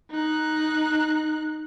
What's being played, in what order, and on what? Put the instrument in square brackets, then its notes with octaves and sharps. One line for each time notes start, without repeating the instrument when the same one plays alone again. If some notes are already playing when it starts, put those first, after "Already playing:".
[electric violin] D#4 F#6